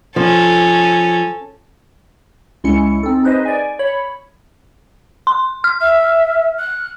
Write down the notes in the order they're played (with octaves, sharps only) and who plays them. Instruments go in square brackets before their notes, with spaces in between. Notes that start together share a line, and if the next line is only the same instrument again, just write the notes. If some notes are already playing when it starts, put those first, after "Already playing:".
[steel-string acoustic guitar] F3 [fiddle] C#4 A4
[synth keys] C#2 G#3 C#4 E4 C#7
C4 D#4 A4
D#4 G#4 B4 C5 D#5
D5 G#5
C#5 B5
[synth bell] C6
F6
[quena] E5
F#6